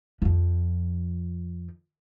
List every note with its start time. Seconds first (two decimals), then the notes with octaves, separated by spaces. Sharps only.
0.22 F2 F3